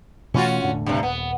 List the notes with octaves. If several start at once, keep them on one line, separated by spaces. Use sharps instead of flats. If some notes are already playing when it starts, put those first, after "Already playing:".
B2 E3 A3 C#4 F4 F#4
E1 A2 D3
G2 C3
D#1 B3